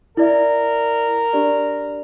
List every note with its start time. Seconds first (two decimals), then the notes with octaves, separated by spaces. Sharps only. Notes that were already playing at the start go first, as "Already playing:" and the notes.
0.17 E4 A#4 D5 E5
1.33 D4 G4 D5